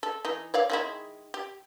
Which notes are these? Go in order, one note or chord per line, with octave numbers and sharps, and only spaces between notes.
A4
E3 D#4
C#5 D5 F5
D#3 G#3 E4
G4